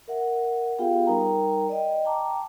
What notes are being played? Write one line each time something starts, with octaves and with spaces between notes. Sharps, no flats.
A#4 E5 F#5
B3 F4 G4 G#4 F5 G5
G3 D#4 A#4 G5 A#5
D5 D#5 G5
G5 A5 A#5 D6